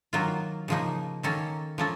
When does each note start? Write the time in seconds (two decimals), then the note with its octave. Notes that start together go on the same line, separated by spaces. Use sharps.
0.13 D#3 F#3 A#3 F4
0.68 C#3 F3 A#3 D#4
1.23 D#3 A#3 C#4 A4
1.78 F3 A#3 C#4 A4